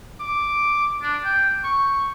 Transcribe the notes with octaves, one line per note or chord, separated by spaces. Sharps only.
D6
D4
G5
C#6